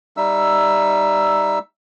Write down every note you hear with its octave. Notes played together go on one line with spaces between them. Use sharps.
G3 D#4 E5 E6